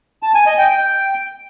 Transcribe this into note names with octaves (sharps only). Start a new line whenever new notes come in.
A5
G#5
D#5
G5
G5